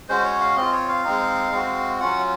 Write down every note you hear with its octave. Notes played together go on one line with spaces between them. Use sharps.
G#3 C#4 F#4 C5
C#5
F5
C4 F4 D#5
C#5
F5
G#3 C4 D#4
G#3 C4 F#4
F#3 C#4 F4 F#5